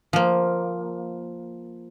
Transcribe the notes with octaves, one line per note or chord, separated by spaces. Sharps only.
F3 A#3